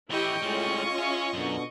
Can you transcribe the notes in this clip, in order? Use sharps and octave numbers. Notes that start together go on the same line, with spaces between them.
A2 E3 E4 G4 D#5 G5 C#6
A2 G3 G#3 C4 C#4 F4
G#4 C#5 E5 F5 G#5
F#2 B2 D3